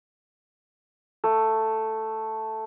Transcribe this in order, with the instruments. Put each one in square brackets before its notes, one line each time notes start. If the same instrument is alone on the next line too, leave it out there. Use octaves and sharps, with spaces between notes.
[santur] A3